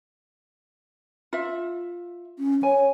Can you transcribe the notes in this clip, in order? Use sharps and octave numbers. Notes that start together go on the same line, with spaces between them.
F4 E5
C#4
C#5 G#5